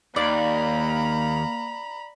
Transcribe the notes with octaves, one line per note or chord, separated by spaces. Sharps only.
D#2 A#3 D5 A#5 B5